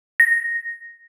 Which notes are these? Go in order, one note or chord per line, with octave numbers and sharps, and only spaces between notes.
A#6